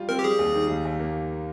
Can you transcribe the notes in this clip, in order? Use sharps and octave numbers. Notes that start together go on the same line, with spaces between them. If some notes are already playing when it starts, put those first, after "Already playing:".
Already playing: G3 F4
C4 A#4
G4
G3 G#4
D#2
D#3
D#2
D#2
A#3